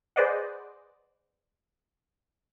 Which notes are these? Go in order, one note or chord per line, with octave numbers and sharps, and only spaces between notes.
G#4 B4 C5 D5 D#5 F#5